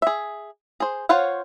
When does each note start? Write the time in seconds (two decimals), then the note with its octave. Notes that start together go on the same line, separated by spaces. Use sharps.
0.02 G#4 E5
0.80 G#4 C5
1.09 F4 C5 C#5 F5 F#5